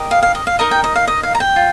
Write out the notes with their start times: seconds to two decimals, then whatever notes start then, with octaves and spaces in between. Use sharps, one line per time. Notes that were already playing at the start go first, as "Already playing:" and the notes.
Already playing: G4 A#4 D#5
0.11 F5
0.23 F5
0.35 D#5
0.47 F5
0.59 D#4 A#4 D#5 A#5
0.71 G5
0.84 D#5
0.95 F5
1.08 D#5
1.23 F5
1.35 A#5
1.40 G5
1.56 F4